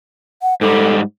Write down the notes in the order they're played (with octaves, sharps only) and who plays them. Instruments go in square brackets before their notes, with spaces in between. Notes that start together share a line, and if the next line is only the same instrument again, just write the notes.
[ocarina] F#5
[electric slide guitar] G#2 G3 [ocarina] A4